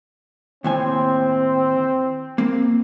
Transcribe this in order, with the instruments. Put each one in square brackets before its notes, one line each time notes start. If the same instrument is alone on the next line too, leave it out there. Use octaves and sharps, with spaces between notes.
[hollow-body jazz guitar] D#2 A2 G#5 [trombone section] C4
[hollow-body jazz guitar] A#3 C4